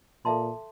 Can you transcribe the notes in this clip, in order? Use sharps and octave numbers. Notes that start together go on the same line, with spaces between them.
A#2 A4 E5 A5 C6